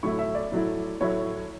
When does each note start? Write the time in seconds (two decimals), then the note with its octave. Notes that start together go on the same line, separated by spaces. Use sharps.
0.03 A2 F#3 A3 E4 C#6
0.19 E5
0.35 D5
0.52 A2 F#3 A3 E4
1.01 A2 F#3 A3 E4 C#5